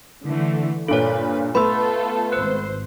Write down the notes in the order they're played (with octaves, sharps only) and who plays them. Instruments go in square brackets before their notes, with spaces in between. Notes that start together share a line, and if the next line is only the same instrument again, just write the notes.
[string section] D3 E3 A3
[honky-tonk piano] G2 A#2 [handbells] A4 C#5 [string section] B4
[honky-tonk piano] A3 B3 [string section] F4 A4 [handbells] B5 C6 E6
[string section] G#1 C5 [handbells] B4 F#6